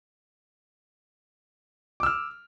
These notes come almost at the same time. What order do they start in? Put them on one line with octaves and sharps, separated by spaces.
D6 E6 F6